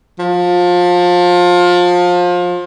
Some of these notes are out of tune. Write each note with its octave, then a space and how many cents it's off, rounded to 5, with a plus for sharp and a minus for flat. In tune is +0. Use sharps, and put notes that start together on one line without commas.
F3 +25